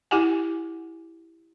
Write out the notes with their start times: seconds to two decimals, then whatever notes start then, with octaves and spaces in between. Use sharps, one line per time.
0.11 E4 G4 F#5 G#5